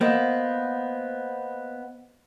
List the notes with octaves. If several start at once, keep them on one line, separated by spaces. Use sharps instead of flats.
A#3 B3 C5 D#5 F5